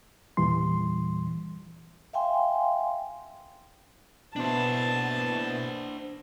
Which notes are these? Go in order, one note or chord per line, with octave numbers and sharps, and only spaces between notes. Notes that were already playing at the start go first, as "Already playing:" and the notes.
E2 A#2 E3 G3 C6
E5 F5 G5 G#5 C6
B2 B3 D4 E4 C5 A5